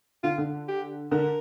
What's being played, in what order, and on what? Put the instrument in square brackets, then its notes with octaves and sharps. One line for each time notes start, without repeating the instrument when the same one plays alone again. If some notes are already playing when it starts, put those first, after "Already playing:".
[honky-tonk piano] D3 [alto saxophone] F4
[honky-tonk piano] D3
[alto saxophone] G4
[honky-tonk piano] D3 [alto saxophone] A#4